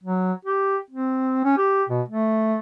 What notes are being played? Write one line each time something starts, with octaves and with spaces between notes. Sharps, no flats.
F#3
G4
C4
C#4
G4
B2
A3